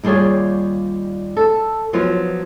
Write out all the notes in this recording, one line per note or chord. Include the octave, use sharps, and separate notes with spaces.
D#2 G3 F4 G#4 C#5
A4
F3 F#3 B3 F4